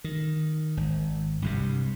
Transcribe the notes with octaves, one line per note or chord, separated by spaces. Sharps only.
D#3
G#1
C2 G2 C3